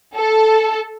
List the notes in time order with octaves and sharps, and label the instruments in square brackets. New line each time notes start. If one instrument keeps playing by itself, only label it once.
[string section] A4